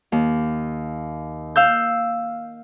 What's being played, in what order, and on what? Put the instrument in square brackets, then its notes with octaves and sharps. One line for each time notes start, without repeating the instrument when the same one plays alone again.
[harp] D#2
F5 E6 G6